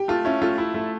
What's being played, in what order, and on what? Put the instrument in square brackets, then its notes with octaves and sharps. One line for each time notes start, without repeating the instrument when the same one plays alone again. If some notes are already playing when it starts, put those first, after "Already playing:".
Already playing: [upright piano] G4
[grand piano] A3 [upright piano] F4
[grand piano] C#4 [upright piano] E4
[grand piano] A3 [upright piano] F4
[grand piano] E4
A3